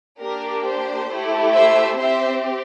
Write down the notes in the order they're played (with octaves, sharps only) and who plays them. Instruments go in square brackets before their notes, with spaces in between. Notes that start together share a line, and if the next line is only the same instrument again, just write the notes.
[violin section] A#3 D4 G4 A#4
C5
A3 E4 G4
C5 E5
C4 G4 C5 E5